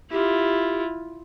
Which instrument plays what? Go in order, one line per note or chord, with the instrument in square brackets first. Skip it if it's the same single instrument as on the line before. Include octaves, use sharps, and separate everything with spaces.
[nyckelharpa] E4 F4 [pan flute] G4